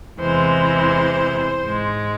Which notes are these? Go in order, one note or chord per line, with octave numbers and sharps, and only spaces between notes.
E2 C3 E3 G#3 C5
G#2 G#3